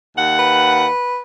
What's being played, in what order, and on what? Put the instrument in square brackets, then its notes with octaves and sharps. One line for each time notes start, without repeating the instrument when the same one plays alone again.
[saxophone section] D#2 F#5
[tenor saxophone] B4